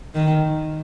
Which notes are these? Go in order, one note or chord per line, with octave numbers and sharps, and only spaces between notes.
D#3